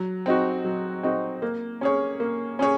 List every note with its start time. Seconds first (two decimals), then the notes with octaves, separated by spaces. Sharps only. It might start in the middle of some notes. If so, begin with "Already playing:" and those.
Already playing: F#3
0.26 C4 D#4 F#4
0.64 F#3
1.03 C4 D#4 F#4
1.42 A#3
1.81 C#4 G#4 C#5
2.20 A#3
2.59 C#4 G#4 C#5